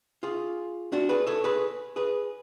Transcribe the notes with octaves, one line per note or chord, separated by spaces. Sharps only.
F4 G#4
D4 F#4
G#4 B4
A4 C#5
G#4 B4
G#4 B4